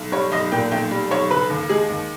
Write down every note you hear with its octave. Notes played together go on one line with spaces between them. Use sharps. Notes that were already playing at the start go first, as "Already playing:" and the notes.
Already playing: B1
G3 C#5
B1 D#5
A#2 G5
B1 G5
G3
B1 C#5
C#3 B4
D#2
G#3 G#4
D#2